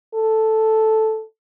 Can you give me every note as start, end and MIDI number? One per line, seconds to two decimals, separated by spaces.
0.15 1.24 69